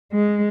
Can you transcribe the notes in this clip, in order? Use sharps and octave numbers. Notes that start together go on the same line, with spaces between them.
G#3